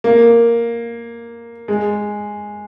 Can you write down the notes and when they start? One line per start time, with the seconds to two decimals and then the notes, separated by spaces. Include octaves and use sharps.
0.04 A#3
1.68 G#3